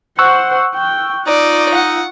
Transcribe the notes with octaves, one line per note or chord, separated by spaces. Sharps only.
C5 F#5 C#6 E6 F#6
G5
D#4 F4 D5
F#5